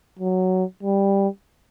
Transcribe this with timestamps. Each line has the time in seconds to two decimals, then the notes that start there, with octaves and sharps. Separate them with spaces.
0.19 F#3
0.83 G3